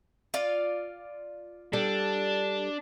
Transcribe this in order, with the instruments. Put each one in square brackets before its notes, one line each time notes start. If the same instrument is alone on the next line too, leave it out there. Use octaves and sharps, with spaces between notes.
[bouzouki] F4 D5 F5
[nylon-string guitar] G3 A4 [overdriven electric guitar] D4